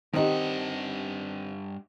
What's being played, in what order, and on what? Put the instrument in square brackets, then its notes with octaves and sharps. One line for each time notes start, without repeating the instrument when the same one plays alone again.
[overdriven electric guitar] G2 F#5 [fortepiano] D#3 D#4 [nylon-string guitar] C4 D4 G4